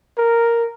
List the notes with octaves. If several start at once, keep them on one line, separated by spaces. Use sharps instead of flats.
A#4